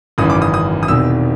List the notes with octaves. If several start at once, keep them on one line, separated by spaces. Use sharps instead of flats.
G#1 F#2 C#3 E3 D#6
D6
D#6
D#6
D#6
E1 E2 C3 D#3 E6